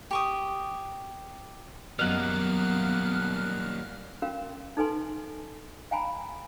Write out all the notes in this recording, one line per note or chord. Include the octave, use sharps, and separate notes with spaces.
G4 C#6 D#6
F#2 F#3 G3 A#3 B3 D#5 F6 F#6
C#4 F#4 A#4 F5 G5
D#4 A4 B4 G#5 C6
F5 G5 G#5 A#5 B5